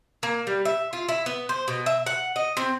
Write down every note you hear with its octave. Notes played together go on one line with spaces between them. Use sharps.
A#3
G3
E5
F4
E4
B3
C5
B2
E5
F#5
D#5
C4